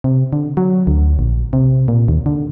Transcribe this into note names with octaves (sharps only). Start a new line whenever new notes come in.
C3
D3
F#3
D2
A#1
C3
A#2
D#2
D3